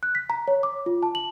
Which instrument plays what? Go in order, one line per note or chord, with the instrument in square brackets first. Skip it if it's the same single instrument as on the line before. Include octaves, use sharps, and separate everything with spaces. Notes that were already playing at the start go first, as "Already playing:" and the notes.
[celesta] F#6
B6
A#5
C#5
D6
F4
A5
F#7